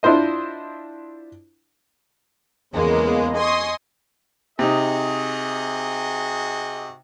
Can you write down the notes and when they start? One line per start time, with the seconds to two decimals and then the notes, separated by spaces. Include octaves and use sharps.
0.03 D4 E4 F4 C5 D#5
2.72 E2 C#3 G#3 A#3 B3
3.37 D#5 G#5 C6 C#6 D#6
4.59 C3 D#4 F#4 G#4 D#5